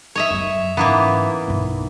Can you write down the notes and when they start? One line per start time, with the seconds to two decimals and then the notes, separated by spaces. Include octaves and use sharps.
0.15 C#5 D#5 E5
0.31 F#2 F#3
0.77 G#2 E3 A#3 B3 C#4
1.48 B1 G2